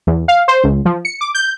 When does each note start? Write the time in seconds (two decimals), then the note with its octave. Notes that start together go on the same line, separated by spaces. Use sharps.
0.07 E2
0.28 F5
0.48 C5
0.64 C#2
0.85 F3
1.05 C#7
1.21 D6
1.34 G6